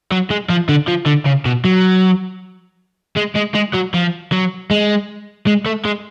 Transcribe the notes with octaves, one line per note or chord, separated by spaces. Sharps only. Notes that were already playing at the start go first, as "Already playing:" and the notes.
F#3
G#3
F3
D3
F3
D3
C#3
B2
F#3
G#3
G#3
G#3
F#3
F3
F#3
G#3
G#3
A3
G#3